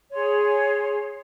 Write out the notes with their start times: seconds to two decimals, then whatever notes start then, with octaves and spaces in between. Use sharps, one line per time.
0.12 G#4 C#5 C6